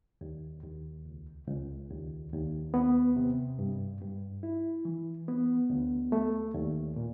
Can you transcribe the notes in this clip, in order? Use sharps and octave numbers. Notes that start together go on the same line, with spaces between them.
D#2
D#2
C#2
C#2
D#2
D#2
B3
C3
G2
G2
E4
E3
B3
D2
A3
D#2
A#2